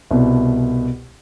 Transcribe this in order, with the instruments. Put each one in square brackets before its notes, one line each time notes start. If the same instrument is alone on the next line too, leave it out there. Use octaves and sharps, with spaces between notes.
[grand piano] C2 B2